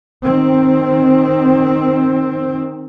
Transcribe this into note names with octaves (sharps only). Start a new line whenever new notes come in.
D#3 C4